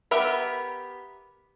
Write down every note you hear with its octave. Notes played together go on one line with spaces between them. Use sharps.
B3 G4 A#4 E5 B5